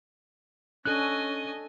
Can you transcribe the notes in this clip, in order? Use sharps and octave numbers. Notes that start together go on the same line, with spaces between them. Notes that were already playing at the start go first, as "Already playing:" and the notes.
C#4 D4 A4 D#5 G#5 F#6